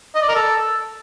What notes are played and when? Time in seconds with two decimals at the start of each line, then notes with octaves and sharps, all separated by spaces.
0.15 D#5
0.22 D5
0.28 A#4
0.35 A4